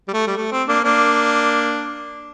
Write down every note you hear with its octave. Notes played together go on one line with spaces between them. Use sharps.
G3
A3
G3
A3
C4
A#3 D4
A#3 D4